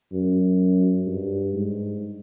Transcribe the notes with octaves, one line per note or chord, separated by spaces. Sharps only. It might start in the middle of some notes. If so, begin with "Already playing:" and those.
F#2
G2
G#2